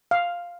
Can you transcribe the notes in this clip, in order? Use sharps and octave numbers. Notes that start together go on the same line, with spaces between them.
F5